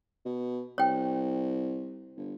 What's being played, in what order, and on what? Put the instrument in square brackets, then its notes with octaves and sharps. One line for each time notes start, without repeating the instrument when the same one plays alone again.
[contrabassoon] B2
[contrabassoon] C2 [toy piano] C#5 G5
[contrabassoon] G1